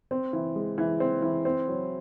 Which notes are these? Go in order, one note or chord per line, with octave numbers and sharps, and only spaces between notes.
C4
E3
G#3
E3
C4
E3
C4
F#3